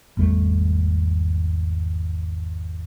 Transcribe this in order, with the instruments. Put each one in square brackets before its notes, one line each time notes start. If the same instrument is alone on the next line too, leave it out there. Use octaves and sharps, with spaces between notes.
[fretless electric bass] G#1 E2 G3 A3